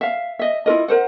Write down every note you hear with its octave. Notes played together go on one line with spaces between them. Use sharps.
E5 F5
D#5 E5
E4 F4 A#4 D#5
A#4 C5 F#5